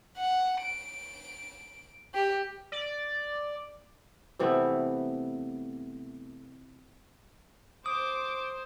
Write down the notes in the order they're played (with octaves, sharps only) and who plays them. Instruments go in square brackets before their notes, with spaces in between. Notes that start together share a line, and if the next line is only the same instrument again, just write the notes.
[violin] F#5
D7
G4
[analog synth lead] D5
[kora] C3 E3 A3 B3
[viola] C5 [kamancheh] D6 [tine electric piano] D#6